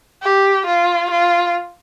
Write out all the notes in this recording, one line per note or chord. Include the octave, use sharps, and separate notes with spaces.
G4
F4
F4